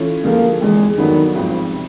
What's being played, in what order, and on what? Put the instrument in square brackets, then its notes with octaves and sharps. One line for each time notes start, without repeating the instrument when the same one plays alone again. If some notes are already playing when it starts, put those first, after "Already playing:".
Already playing: [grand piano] E3 A3 C#4 F4
[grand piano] D2 D3 F3 G#3 [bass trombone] A#3
[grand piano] E2 C3 E3 [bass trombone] G#3
[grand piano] G2 D3 F#3 B3 D4 [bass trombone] D#3
[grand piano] G#1 G2 D#3 G#3 C4 [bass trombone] F3
[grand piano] C3